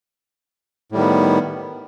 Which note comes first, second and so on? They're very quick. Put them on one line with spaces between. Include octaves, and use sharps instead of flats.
A2 G3 D#3 B3